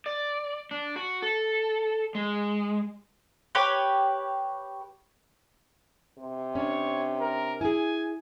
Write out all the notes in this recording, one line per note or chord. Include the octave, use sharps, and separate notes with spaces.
D5
D4
F#4
A4
G#3
G4 B4 C#5
C3
C#4 D4 C#5
A#4
E4 G#4 G#5